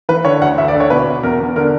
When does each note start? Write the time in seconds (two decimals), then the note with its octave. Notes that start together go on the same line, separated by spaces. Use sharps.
0.09 E3 B4
0.25 D3 C#5
0.41 D2 F#5
0.58 D2 E5
0.68 D5
0.75 D3
0.80 C#5
0.90 B2 B4
1.07 B2
1.23 E2 A#4
1.40 E2
1.56 D3 A#4